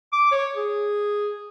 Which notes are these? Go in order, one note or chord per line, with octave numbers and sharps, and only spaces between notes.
D6
C#5
G#4